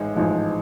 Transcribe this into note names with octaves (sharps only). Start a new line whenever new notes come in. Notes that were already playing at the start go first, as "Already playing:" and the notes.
Already playing: A1 G#2 G#3
A1 G#2 F3 G#3